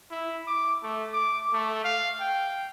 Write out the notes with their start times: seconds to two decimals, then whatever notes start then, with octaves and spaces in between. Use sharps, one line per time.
0.11 E4
0.47 D6
0.83 A3
1.13 D6
1.53 A3
1.84 F5
2.20 G5